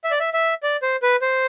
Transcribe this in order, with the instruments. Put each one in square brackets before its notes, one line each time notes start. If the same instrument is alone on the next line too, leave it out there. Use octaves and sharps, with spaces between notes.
[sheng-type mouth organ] E5
D5
E5
E5
D5
C5
B4
C5